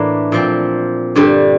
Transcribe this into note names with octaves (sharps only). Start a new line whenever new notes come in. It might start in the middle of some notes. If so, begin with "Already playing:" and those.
Already playing: A2 E3 A#3 D4
A#2 F3 C4
G2 D3 G3